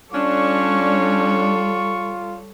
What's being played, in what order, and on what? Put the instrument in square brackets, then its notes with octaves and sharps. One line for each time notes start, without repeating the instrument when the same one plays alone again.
[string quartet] G3 A4 C#5 [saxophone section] C#4 D4 [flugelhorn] F4 [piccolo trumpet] C#6